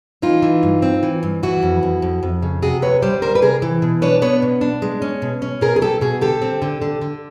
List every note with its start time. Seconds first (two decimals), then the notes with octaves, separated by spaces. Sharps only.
0.22 E3 D#4 F4
0.42 E3
0.63 G2
0.82 C4
1.03 E3
1.23 G2
1.43 E3 E4 F#4
1.62 F2
1.83 F2
2.02 F2
2.23 F2
2.42 C#3
2.62 C3 F#4 G#4
2.82 D2 B4 C#5
3.02 G3 C5 D5
3.22 D2 A#4 C5
3.35 B4
3.42 C3 G#4 A#4
3.62 E3
3.82 B2
4.02 D4 B4 C#5
4.22 B3 B4 C#5
4.42 B2
4.61 D4
4.82 G#3
5.02 C#4
5.22 B2
5.42 C#4
5.61 B2 G#4 A#4
5.76 G#4
5.82 B2 G4 A4
6.01 B2 F#4 G#4
6.21 D3 G4 A4
6.42 C4
6.62 D3
6.82 D3
7.01 D3